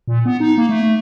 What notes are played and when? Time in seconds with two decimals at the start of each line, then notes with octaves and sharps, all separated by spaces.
0.08 A#2
0.25 B3
0.40 D#4
0.58 A#3
0.69 A3